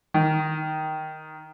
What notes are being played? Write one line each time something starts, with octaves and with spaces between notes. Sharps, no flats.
D#3